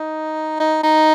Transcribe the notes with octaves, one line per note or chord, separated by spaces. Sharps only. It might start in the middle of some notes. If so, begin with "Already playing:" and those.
Already playing: D#4
D#4
D#4